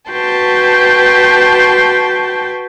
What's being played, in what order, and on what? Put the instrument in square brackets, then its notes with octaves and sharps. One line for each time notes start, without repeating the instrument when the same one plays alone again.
[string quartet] F#4 B4 G5 A5 C6